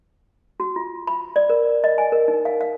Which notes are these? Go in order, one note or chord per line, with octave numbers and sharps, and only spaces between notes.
F#4
F4
B5
D5
A#4
D#5
G#5
A#4
D#4
F5
F5